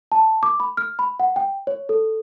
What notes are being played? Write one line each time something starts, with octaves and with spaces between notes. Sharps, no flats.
A5
D6
B5
F6
B5
F#5
G5
C#5
A4